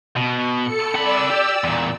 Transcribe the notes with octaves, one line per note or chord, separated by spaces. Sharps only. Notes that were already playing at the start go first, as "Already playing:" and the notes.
B2
A4 C#7
C4 D5 B5 E6
G4
E2 A#2